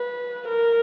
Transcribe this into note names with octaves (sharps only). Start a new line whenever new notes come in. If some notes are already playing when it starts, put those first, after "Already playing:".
Already playing: B4
A#4